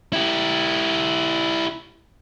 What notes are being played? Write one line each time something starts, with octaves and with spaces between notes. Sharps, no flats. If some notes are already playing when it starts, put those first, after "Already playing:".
E4 G4